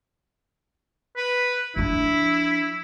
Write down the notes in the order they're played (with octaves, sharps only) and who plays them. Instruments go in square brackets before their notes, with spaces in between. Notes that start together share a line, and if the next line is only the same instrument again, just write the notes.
[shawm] B4
[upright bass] F3 D4 [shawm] E4